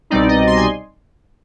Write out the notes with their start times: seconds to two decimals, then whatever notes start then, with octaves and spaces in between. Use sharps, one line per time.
0.10 C2 B2 G3 C4 D#4 D5
0.29 D#5
0.47 C6
0.57 G#5